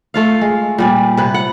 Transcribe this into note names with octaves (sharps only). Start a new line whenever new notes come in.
A3 F4 F5
G#3
A#2 G3 D5
C3 B4
F#5